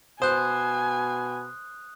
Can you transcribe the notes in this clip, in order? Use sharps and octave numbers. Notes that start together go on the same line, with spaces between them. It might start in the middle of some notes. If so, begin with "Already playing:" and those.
B2 C5 G#5 D#6 F#6